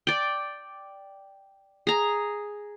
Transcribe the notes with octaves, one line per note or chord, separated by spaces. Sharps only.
D5 G5
G#4 A#5